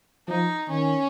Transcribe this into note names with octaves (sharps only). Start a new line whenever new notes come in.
F3 D#4
D#3 C#4